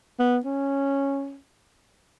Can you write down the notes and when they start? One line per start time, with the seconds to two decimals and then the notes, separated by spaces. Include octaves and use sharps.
0.19 B3
0.45 C#4